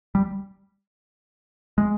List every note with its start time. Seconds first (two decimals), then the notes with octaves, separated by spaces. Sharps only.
0.15 G3
1.78 G#3